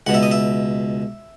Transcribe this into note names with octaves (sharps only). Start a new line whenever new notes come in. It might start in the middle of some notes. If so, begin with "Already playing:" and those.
C#2 B2 F#5
E5
D#5
E5